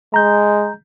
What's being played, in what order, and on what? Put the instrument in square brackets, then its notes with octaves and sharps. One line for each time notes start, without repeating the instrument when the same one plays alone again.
[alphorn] G#3 [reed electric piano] A#5 G6